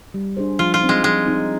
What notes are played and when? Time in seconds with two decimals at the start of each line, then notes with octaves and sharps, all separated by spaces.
0.14 G3
0.37 D4 G#4 C5
0.59 F3 F4
0.74 F4
0.81 C4 D#4
0.89 G#3
1.03 F3 G#3
1.26 C4 D#4